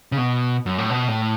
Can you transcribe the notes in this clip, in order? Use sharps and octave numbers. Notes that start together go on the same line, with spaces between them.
C#3
B2
F#2
A2
B2
A2